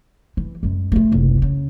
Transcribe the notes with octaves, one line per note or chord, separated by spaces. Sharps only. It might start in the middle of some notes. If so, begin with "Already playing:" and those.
E3
F#2 G#3
A3 F4
F#1 C2
C#3